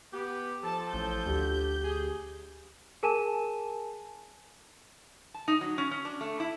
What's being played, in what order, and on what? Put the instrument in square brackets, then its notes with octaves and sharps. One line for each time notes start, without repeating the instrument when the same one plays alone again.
[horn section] B3 G4
[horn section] F3 A4 [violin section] A5
[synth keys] A1 [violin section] G6
[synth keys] D2 [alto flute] G4
[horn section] G#4
[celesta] G#4 A#4 G#5 A5 D#7 E7
[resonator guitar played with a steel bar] A5
D#4
F#3
C#4
C#4
D4
A3
E4